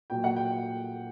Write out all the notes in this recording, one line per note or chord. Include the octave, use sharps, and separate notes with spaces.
A#2 F#3 G5
F#5
G5